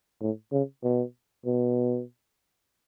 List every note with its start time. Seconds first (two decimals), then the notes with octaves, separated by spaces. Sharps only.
0.21 A2
0.52 C#3
0.84 B2
1.46 B2